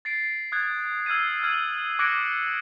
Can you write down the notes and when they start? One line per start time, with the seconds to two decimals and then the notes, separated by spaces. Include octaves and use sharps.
0.05 A6 C7 D7
0.52 D#6 F#6 G#6 A6
1.06 E6 F6 G#6 C7 D#7
1.43 F6 G#6 D#7 F#7
1.99 D6 F#6 G#6 A#6 C#7 D7